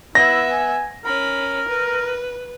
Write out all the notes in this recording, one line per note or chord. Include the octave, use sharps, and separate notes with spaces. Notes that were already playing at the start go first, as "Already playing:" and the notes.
B3 E4 E5 A#6
G#5
C#4 A#4 B5
B4